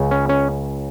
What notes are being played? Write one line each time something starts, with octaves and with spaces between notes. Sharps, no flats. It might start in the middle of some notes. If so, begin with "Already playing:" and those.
Already playing: C#2 C#3
C#4
C#4